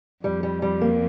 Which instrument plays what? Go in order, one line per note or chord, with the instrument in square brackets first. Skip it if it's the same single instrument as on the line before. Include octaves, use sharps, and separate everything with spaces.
[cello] F2 [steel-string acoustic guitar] G3
[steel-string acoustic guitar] G3
G3
A#3